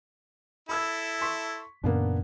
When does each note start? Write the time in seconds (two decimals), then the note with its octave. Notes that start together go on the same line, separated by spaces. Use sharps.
0.69 E4 A4 B5 E6 G#6
1.21 C6 C#6 B6
1.83 F#2 A#2 C#3 A#3 B3 D4